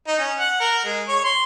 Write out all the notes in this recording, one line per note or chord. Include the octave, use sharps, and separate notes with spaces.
D#4
C#4
F#5
A#4
G#3
C#5
C6